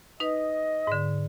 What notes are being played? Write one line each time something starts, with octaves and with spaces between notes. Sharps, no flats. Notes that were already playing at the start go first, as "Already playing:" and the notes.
D#4 B4 D#5
G#2 D3